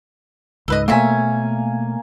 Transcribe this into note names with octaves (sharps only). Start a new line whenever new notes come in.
C#2 G#2 A4 B4 D#5
B2 A3 A#3 C4 C#4 E5 G#5